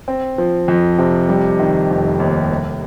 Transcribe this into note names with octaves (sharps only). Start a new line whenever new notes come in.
C4
F3
F2
C3
G3
D#3
F1
D#2
C2